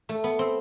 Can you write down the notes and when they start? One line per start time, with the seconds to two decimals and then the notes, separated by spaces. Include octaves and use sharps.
0.09 A3
0.24 B3
0.39 C4